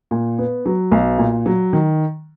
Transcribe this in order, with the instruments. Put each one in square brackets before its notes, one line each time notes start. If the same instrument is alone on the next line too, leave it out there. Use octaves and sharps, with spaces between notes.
[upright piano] A#2
B3
F#3
B1
A#2
F#3
D#3